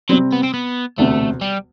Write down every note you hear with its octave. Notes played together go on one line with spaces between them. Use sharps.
C3 F#3 G3 C4
B3
C4
B3
E1 D2 C3 A3
G3